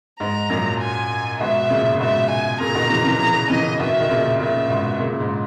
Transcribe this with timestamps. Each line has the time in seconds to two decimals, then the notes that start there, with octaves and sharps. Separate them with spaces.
0.20 G#2 A#5
0.50 F#2 A#2
0.79 G#5
1.39 G#2 B2 E5
1.70 A#2 C#3
1.93 A#2
2.00 G#2 B2 E5
2.30 G#5
2.60 A#2 C#3 A#5
2.75 B2 D#3
2.90 C#3 E3
3.05 C#3 E3
3.19 C#3 E3 A#5
3.50 C#3 E3 D#5
3.80 B2 D#3 E5
4.00 D#3
4.09 A#2 C#3
4.40 A#2 C#3 E5
4.70 G#2 B2
4.99 A#2 C#3
5.20 G#2